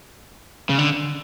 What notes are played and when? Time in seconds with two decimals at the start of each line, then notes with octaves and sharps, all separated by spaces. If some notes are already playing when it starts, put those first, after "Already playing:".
0.70 C#3
0.78 D3